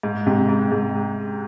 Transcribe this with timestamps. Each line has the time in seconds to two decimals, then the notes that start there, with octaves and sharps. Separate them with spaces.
0.03 G#2
0.27 G#2 C3
0.49 G#2
0.72 G#2